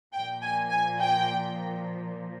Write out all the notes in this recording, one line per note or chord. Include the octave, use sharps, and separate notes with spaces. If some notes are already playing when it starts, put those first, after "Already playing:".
A#2 F3 G5
G#5
G#5
G5